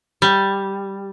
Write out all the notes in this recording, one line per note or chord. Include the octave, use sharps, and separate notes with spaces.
G3